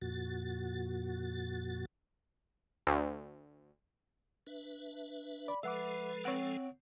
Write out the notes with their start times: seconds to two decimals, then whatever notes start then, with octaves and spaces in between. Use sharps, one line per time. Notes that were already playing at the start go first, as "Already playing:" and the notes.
0.02 F2 A#2 F#4 A6
2.87 D2
4.47 D4 B4 E5
5.48 D5 B5
5.63 F3 G#3 A4 B4 E5 F#5 D6
6.25 C4 C#5 F#5